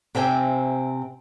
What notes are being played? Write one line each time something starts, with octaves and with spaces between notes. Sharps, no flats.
C3 C4 E5 G5 G#5